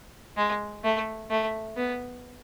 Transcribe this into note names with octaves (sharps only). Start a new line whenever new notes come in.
G#3
A3
A3
B3